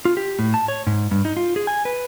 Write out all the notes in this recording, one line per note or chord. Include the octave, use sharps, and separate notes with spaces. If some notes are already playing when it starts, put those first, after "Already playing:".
F4
G4
A2
A5
C#5
G#2
G2
D#4
F4
G#4
G#5
B4